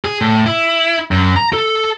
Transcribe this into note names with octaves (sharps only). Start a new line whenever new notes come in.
G#4
A2
E4
F#2
A#5
A4